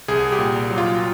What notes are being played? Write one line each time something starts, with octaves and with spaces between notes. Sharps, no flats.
C2 G#4
G4
A#2
F#3
F4